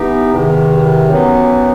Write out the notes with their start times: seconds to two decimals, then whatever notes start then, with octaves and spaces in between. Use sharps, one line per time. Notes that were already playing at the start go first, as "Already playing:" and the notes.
Already playing: E3 B3 D#4 G4
0.33 E2 C3 D#3
1.09 F#2 E3 B3 D#4